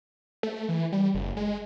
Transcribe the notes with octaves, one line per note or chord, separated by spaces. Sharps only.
A3
E3
G3
F#1
G#3